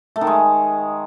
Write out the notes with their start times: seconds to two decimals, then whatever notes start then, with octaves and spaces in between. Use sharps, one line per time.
0.16 A3
0.21 D#3
0.27 G#3